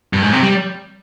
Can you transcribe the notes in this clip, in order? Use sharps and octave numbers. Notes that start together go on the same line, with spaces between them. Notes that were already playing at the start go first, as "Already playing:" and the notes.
G2
G#2
C3
G3